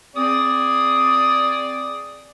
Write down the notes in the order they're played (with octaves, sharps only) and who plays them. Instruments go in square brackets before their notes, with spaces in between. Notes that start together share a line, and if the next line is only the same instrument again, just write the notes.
[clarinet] C4 [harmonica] G#4 D5 [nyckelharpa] D#6